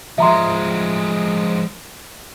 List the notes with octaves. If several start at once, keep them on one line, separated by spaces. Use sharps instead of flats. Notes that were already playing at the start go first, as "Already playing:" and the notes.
F3 G#3 E5 A#5 C6